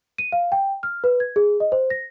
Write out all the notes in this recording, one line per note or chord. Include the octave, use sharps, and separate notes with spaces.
D#7
F5
G5
F6
B4
G#6
G#4
D#5
C5
A#6